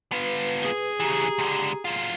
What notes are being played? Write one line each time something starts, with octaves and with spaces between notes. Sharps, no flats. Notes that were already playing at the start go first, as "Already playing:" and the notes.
B3 F4 B4
G#4
C#3 E3 G4 A#5
C#2 D3
F#2 F4